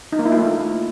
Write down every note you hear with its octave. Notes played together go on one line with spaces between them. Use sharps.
D#4
A#3
E4
F4
A3